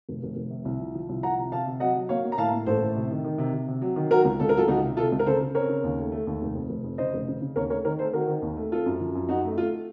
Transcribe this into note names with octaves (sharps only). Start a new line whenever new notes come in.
F1
F1
F1
C3
C2
F3
F3
C2
F3 F#5 A#5
C3
C3 F5 A5
C3
F#3 D#5 F#5
F#3
A#3 C#5 F5
A#3
A#5
A2 F5 A5
A#3
A1 A4 C5
A2
C3
D#3
D#3
C3
C3
C3
F#3
D#3
F#3 F#4 A#4
C#2
C#2 A4
A#4
F#3 F4 A4
C#2 D#4 F#4
C3
C3 F4 A4
C#2
A#4
C#3 A4 C5
C#3
C4 A#4 C#5
C#3
D#2
A3
A3
D#2
F1
F2
F1
F2
C#3 C5 D#5
F1
C#3
C#3
D#2 A#4 C#5
A3 A#4 C#5
D#3 A#4 C#5
A3 A4 C5
D#3 F#4 A#4
D#3
D#2
A3
C4 F4 A4
F#2
F3
F#2
F#2 D#4 F#4
A3
A3 F4